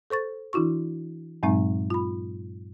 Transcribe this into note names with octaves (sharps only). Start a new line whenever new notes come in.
A4 C5 C#6 A6
E3 D4 E4 F#4 C#6
G2 A#2 F#3 G#3 C4 D#4
F4 B5